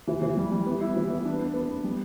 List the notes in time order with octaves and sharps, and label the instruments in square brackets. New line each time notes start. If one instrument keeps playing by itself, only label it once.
[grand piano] E3
E3
G3
G3
B3
E4
E3
B3
D4
B3
B3
B3
G3